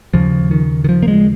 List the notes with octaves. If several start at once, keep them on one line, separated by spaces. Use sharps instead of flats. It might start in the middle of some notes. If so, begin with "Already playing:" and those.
D#2 C#3 F3
D#3
D#3
F3
A#3
G#3